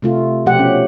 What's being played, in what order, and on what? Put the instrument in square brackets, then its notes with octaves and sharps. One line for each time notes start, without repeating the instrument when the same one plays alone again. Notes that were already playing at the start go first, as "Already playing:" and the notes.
[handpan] C3 A3 F4
B2 F3 A3 G4 F#5
C#4